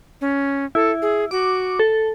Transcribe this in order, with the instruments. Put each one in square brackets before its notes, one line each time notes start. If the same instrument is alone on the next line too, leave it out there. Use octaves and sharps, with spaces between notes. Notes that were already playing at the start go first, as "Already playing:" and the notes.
[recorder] C#4
[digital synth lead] E4 [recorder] A4
[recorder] G#4
[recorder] F#4 [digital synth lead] D6
[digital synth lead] A4